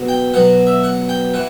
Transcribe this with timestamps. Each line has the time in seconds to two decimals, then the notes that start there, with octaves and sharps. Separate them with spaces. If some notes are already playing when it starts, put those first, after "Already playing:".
Already playing: B2 F#3
0.09 G5
0.34 B2 F#3 F#5
0.67 E5
0.84 F#5
1.09 G5
1.34 E3 F#5